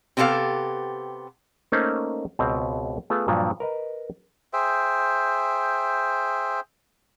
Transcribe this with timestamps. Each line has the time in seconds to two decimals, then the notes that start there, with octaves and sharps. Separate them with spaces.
0.17 C3 B3 E4 G4 A4 F5
1.72 A3 A#3 C#4 D#4 C5
2.39 C#2 B2 C4
3.10 A3 B3 F4 G#4 B4
3.28 G2 A#2 F3 F#3
3.60 A#4 B4 D#5
4.53 G#4 C5 E5 G5